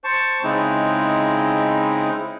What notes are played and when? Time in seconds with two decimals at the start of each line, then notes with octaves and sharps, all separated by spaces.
0.04 C5 A5 C#6
0.43 C#3 G#3 C4 D#4 E4